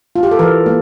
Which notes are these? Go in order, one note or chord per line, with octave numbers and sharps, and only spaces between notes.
F4
G4
A4
E3 A#4
A#3